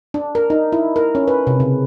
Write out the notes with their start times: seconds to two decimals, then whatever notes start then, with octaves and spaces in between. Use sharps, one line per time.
0.14 D4
0.35 A#4
0.50 D#4
0.73 E4
0.96 A#4
1.15 C#4
1.28 B4
1.47 C3
1.60 C#3